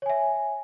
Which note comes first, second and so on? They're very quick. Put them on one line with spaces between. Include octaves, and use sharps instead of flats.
C#5 G#5 E5